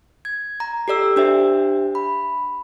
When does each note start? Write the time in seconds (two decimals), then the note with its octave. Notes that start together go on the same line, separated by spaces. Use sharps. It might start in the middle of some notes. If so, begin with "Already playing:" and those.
0.25 G#6
0.60 A#5
0.88 G4 A4 D5 E6
1.16 D4 G4 C5 E5
1.95 B5